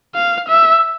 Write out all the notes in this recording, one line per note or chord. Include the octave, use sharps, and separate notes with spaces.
F5
E5